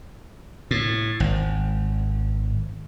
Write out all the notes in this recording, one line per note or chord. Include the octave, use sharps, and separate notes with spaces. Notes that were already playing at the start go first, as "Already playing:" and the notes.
A2
G#1